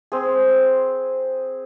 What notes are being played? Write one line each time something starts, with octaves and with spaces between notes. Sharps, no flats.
C4 G#4